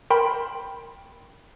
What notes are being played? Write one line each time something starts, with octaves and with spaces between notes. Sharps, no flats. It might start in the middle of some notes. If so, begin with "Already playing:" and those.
A#4 G5 B5 C6